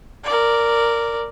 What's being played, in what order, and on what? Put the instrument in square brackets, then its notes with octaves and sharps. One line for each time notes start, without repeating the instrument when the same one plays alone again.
[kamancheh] A#4 D5